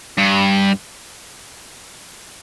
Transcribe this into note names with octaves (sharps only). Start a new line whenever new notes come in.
G2